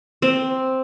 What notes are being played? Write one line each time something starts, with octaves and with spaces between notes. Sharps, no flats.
C4